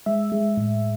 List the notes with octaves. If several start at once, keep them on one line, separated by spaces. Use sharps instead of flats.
G#3 E5
G#3
A2